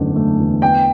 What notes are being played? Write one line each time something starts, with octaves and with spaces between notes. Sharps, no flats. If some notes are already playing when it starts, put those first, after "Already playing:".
Already playing: F#1 E2 D3 A3
A3
E2
B3 G5